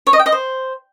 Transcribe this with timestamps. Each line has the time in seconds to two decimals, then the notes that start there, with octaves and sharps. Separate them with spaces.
0.07 C#5
0.13 D#5
0.19 G5
0.26 D#5
0.32 C5